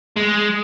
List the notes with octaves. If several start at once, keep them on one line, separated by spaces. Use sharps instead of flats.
G#3